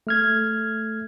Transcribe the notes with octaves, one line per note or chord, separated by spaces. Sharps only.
A3 F6 G#6